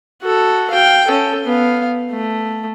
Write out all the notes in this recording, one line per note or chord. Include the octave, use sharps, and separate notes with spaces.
F#4 A4
F5 G5
C#4 A4
B3 F5
A3